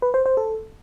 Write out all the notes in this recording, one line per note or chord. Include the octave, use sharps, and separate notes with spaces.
B4
C5
C5
A4